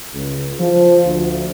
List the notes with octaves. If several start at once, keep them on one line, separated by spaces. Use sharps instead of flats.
C#2
F3
D2